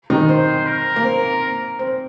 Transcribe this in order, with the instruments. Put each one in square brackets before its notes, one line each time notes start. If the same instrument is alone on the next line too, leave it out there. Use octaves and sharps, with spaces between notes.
[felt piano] D#3 D#4
[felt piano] C4 [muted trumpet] C5
[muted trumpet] A#4
[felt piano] A#3
C4
C4